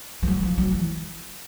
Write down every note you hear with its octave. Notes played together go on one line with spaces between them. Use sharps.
F3
F#3
F3
F#3
E3